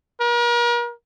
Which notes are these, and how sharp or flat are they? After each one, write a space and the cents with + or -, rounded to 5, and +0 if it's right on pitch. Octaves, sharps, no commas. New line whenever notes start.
A#4 +40